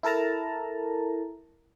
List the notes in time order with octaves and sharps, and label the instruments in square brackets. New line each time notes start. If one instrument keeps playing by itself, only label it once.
[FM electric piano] E4 A4 A#4 A5 A#5